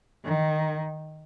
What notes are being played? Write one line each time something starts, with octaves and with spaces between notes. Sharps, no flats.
D#3